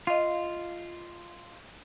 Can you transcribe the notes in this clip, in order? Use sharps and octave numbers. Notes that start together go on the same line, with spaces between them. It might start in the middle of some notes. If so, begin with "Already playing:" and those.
F4 D#5 F5